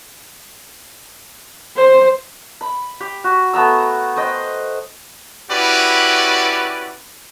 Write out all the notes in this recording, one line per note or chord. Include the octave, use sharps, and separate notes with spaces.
C5
B5
G4
F#4
A3 B3 A#5 E6
C5 D#5 G5
C#4 E4 F#4 G4 B4 D5